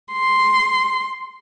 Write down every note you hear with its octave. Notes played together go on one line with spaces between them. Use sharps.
C6